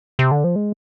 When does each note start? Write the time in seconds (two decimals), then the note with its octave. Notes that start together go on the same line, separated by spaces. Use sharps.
0.19 C3
0.31 D3
0.44 F3
0.56 G#3